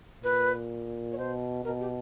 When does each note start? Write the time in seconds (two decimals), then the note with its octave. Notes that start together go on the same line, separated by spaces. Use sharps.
0.23 A#2 B4
1.12 C#5
1.18 B2 C5
1.64 B2 A#4
1.80 G4